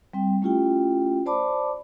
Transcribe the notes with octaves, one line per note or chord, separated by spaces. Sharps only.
G3 C4 G5
A3 C#4 E4 F4 G4 G5
C5 D5 A5 B5 D6